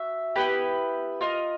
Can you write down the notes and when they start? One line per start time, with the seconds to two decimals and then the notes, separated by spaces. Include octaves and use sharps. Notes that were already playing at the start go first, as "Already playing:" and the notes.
Already playing: F#4 E5
0.36 B3 E4 G4 B4
1.21 F4 A#4 D#5